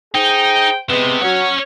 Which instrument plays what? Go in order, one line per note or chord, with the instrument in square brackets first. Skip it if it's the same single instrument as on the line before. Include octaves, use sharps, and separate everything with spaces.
[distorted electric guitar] D#4 [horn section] G#4 C5 G5
[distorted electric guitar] C3 [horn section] G#3 B3
[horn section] F#3 [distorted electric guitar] C#4 C#5